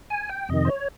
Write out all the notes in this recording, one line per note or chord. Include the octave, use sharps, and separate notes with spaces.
G#5
G5
F2 C3 D#3 D#5
C5
C#5